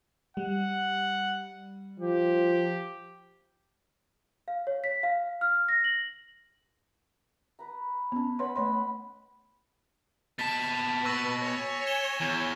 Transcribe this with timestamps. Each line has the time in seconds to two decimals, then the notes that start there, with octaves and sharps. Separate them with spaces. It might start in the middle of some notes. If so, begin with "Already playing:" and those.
0.37 G3 F#5
2.00 F3 G4
4.48 F5
4.67 C#5
4.84 B6
5.03 F5
5.41 F6
5.68 A#6
5.84 F#7
7.59 B4 A#5
8.12 B3 C#4
8.39 B4 C#5 F#5 B5 C6
8.56 A3 C#5 D#5 C6
10.39 B2 A5 A6 B6
11.05 B4 C#6 E6 A#6
11.43 C#5 G#5
11.86 G#6 E7 G7
12.21 E2